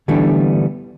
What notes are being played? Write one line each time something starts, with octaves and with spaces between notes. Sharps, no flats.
D3 E3 G3 A3 B3 D4